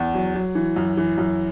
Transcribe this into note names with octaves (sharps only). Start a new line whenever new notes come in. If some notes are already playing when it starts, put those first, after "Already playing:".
Already playing: E2
F#3
F#3
E3
F#2
E3
F#2